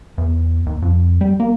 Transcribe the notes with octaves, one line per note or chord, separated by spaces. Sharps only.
E2
D#2
F2
G3
A#3